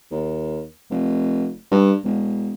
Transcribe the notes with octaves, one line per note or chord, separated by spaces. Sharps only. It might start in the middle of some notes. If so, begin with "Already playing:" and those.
D#2
F1
G2
E1